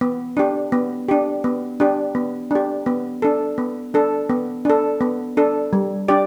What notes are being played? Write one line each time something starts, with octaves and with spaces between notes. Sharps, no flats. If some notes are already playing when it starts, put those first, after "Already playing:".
B3
D4 G4
B3
D4 G4
B3
D4 G4
B3
D4 G4
B3
D4 A4
B3
D4 A4
B3
D4 A4
B3
D4 A4
G3
D4 G4 D5